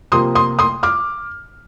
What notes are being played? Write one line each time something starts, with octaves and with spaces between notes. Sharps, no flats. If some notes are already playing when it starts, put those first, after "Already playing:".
C3 F3 A#3 C6 D#6
C6 D#6
C6 D#6
D6 F6